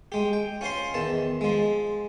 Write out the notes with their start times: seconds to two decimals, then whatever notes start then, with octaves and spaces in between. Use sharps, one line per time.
0.12 G#3 G4
0.33 G5
0.61 C#4 F4 C5 C6
0.94 E2 D#3 A5
1.41 F3 G#3